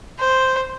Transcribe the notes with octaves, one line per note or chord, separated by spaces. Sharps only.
C5